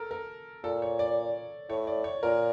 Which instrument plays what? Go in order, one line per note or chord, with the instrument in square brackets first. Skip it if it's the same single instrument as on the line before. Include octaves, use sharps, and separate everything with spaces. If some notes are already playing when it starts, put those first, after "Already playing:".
Already playing: [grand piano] A4 A#4
A#4
[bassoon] A#2 [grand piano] A4
[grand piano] C#5
D5
[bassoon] A2 [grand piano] C#5
[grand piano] D5
C#5
[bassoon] A#2 [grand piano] A#4